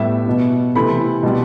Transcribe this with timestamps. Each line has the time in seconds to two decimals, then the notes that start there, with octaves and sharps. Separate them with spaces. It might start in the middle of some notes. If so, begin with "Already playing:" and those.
Already playing: A2 G3 B3 E5
0.26 B2 B3
0.75 C3 E3 A3 C4 B5
1.23 B2 G3 C4